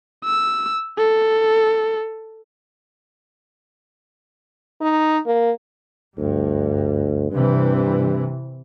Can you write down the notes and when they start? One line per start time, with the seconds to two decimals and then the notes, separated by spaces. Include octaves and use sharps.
0.25 E6
0.98 A4
4.82 D#4
5.26 A#3
6.18 D2 G2
7.31 G2 C3 E3